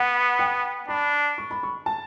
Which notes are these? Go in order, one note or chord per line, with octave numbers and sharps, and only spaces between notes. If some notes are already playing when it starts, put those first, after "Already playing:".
Already playing: B3 F#5
G5
D4 B5
C#6
B5
C#6
A5